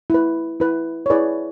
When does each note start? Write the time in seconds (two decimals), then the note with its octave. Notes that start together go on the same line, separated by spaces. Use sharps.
0.10 E4 B4
0.60 E4 B4
1.06 C#5
1.10 E4 G#4 B4 D5